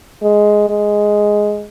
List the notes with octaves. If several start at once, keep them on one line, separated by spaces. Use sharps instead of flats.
G#3
G#3